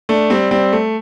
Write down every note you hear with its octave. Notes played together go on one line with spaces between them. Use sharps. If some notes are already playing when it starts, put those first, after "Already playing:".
A3 D4
G3 C4
G3 C4
A3